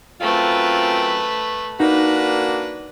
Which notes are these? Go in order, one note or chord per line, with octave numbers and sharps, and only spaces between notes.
F#2 A3 C4 F4 B4
A#3 D4 D#4 F#4 B4